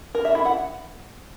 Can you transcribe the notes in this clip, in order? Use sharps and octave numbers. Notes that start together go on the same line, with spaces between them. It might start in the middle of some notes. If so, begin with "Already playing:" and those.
A#4
E5
E4
F#5